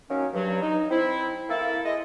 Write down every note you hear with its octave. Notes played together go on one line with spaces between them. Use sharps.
D#3 F#3 A#3 C#4
G2 F#3
D#4
C4 E4
A#3 E4 A4
G#3 E4 D#5